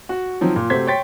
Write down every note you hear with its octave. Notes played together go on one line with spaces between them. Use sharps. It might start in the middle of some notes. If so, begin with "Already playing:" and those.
F#4
D#3 F3 F#3 C4
A#2
C3 A3 F#4 C5 G#6 B6
C#5 G5 C6 A6 B6